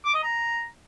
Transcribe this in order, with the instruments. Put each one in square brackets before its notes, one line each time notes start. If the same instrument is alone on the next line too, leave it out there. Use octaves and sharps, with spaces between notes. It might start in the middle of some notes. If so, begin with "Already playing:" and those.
[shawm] D6
D#5
A#5